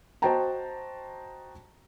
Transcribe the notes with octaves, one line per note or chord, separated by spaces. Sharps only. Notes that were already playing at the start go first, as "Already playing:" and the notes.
F#4 C5 D#5 G5 A5 A#5